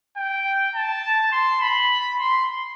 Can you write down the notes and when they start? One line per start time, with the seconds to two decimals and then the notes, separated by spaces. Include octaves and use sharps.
0.17 G5
0.75 A5
1.32 C6
1.61 B5
2.20 C6